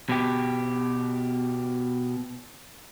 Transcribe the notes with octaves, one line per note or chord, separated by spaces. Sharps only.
B2 G4